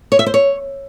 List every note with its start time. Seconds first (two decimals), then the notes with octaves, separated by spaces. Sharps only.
0.12 C#5
0.19 E5
0.26 C5
0.34 C#5